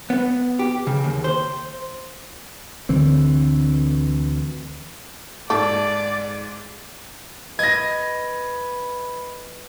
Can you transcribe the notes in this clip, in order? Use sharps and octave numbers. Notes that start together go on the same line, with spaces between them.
B3
G4
C#3
D#2
C5
D2 D3 E3 C4
G#2 A4 D5 D6
B4 D#5 G#6 A#6